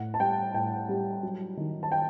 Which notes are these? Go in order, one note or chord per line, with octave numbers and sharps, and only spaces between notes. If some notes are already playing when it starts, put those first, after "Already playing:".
Already playing: A2 F#5
A5
G3 G5
A2 G5
G3
F#3
D#3
A5
G5